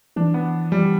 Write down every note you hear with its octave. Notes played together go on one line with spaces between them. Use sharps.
E3 D4
B3
G3